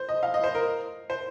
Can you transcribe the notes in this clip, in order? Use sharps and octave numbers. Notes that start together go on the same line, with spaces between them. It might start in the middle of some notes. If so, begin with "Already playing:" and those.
Already playing: C5
D#5
F5
D#5
C5
A#4
C5